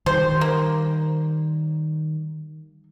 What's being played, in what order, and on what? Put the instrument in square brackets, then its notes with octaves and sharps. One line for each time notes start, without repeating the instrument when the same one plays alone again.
[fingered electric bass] D#3 G3 [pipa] C5
[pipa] A#3